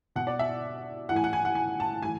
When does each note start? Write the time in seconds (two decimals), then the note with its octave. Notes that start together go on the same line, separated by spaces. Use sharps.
0.16 B2 F#5
0.27 D5
0.39 E5
1.09 E3 F#5
1.13 A2 G#5
1.24 F#5
1.33 G#5
1.45 F#5
1.55 G#5
1.80 A5
2.02 A2 E3 G#5